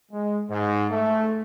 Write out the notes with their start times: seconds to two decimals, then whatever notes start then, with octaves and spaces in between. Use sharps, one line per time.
0.12 G#3
0.50 G#2
0.91 A3